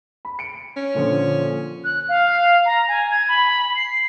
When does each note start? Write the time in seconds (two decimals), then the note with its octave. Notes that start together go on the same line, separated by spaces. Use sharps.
0.25 B5
0.39 C#7 D7
0.76 C#4
0.95 A#2 D3 F3
1.84 F#6
2.09 F5
2.66 A#5
2.88 G#5
3.11 G#6
3.28 B5
3.76 C7